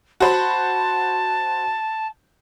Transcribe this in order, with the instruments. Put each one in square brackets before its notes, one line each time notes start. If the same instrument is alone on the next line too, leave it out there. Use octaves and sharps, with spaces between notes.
[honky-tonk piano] F#4 C5 B5 [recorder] A5